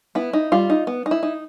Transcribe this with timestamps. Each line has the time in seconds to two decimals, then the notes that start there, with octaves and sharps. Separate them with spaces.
0.15 B3 E4
0.33 D#4
0.52 G3 F4
0.70 D#4
0.87 B3
1.06 D#4
1.11 E4
1.23 D#4